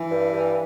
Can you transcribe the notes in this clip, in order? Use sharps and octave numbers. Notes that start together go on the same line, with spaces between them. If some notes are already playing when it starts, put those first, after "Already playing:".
Already playing: E3
G2
G2